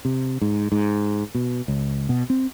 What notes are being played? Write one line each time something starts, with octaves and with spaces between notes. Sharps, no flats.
C3
G#2
G#2
B2
C#2
B2
C4